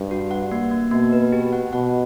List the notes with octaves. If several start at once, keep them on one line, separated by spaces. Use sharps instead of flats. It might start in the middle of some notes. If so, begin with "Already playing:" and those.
Already playing: G2
F#4
F#5
A#3
A#3
B2 A#3
B4
G4
F#5
B2 F#5